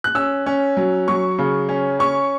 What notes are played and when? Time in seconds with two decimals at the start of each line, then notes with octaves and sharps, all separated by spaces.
0.04 F#6
0.15 C#4 E6
0.46 C#4
0.77 F#3
1.08 F#3 C#6
1.38 C#3
1.69 C#4
1.99 C#4 C#6